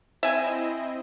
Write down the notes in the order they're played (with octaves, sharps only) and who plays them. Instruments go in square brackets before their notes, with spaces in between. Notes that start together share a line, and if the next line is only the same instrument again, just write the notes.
[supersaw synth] C4 E4 D#5 [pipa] E5 G#5